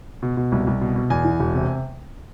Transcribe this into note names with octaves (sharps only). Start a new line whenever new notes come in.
B2
B2
C2
C2
B2
B2
E2 G#5
E3
E1
C3